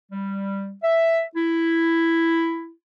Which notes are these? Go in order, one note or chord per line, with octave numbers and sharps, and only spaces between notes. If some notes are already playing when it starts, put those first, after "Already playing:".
G3
E5
E4